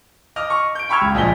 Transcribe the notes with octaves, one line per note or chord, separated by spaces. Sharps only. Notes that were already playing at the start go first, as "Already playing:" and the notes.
D#5 D6 F6
C#6
G6 D7
G5 B5 C#6 E6 F6 G#6
C#2
A#1 F3 D#5 B6 G7